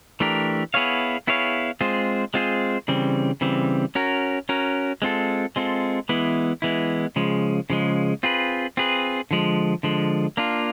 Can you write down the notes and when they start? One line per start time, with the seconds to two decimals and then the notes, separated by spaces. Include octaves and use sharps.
0.20 E3 A3 D4 G4 A#4
0.74 B3 E4 G#4 C#5 F5
1.27 B3 E4 G#4 C#5 F5
1.81 G#3 C4 F4 G#4 C5
2.34 G#3 C4 F4 G#4 C5
2.88 C#3 E3 G3 C4
3.41 C#3 E3 G3 C4
3.95 C#4 F#4 A#4
4.49 C#4 F#4 A#4
5.02 G#3 C4 F4 A4
5.56 G#3 C4 F4 A4
6.09 E3 G#3 B3 E4
6.62 E3 G#3 B3 E4
7.16 C#3 F3 G#3
7.70 C#3 F3 G#3
8.23 C4 F4 G#4 B4
8.77 C4 F4 G#4 B4
9.31 D3 F3 G#3
9.83 D3 F3 G#3
10.37 A#3 D4 F4